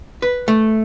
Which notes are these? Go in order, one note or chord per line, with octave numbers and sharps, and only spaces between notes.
B4
A3